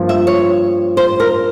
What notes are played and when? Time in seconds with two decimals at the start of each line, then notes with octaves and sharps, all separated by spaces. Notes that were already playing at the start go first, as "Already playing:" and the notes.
Already playing: G2 F3 A#3
0.09 E5
0.27 C#5
0.97 C5
1.20 A#4